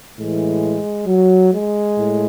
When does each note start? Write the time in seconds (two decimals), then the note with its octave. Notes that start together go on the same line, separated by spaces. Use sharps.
0.16 A2 E3 G#3
1.06 F#3
1.51 G#3
1.97 A2